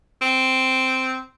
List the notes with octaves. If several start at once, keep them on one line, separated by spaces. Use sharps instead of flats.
C4